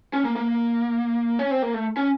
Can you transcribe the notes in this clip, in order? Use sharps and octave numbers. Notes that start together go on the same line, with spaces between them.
C#4
A#3
A#3
C#4
C4
A#3
A3
C#4